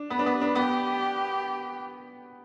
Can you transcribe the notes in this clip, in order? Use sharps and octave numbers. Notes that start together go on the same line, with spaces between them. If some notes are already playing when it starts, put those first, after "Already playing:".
Already playing: D4
B3 B4
D4
B3
D4
B3 G4